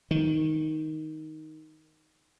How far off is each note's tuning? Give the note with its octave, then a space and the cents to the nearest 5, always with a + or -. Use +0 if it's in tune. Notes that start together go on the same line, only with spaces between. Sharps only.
D#3 +5